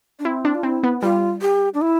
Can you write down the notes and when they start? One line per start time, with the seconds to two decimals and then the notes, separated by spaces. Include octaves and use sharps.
0.19 D4
0.25 C4 E4
0.45 D4
0.55 F4
0.63 C4 E4
0.83 B3
1.02 G3 F4
1.42 G4
1.74 D4
1.82 E4